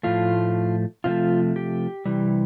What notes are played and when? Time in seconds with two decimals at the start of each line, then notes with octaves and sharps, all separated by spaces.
0.03 A2 F3 A3 F4
1.04 C3 F3 A3 F4
1.56 G4
2.05 C3 E3 G3